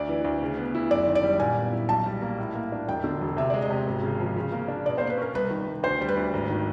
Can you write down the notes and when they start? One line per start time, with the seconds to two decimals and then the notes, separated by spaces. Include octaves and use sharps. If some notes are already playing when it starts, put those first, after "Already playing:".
Already playing: D2 D5
0.09 E3
0.25 D2
0.42 C#3
0.57 B3
0.75 E4
0.90 F#1 D5
1.07 D#3
1.15 D5
1.24 G3
1.40 A#2 G#5
1.57 B3
1.72 E4
1.89 B1 A5
2.06 G3
2.22 A#3
2.38 A2
2.55 A#3
2.72 D4
2.88 E1 G5
3.04 D3
3.21 E1
3.37 C3 E5
3.50 G#3 D5
3.62 D#5
3.70 C3
3.87 G#1
4.03 C#3
4.19 F3
4.36 C#3
4.52 A#3
4.68 D4
4.86 B2 D5
4.98 A#3 C5
5.10 B4
5.18 C#4 A#4
5.35 C2 B4
5.50 D#3
5.67 C2
5.83 D2 C5
6.01 G3
6.09 B4
6.17 D2
6.34 G#1
6.50 D#3